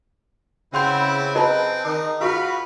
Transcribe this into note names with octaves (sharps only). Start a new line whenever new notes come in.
C#3 C4 E4 B4 F#5 G5 C6 G6
C4 G#4 B4 D#5 A5 A#5
D#3 D#4
F4 F#4 G#4 B4 F5 B5